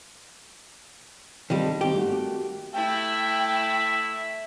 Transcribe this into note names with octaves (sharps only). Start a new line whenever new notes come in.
D#3 G3 C4 F4 A4
D#3 C4 G4
A3 A#3 F#4
A3 E4 E5 G5